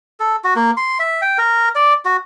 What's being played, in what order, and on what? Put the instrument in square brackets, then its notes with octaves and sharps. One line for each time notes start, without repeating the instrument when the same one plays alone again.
[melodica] A4
F#4
A#3
C6
E5
G5
A#4
D5
F#4